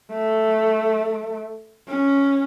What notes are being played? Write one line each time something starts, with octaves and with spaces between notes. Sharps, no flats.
A3
C#4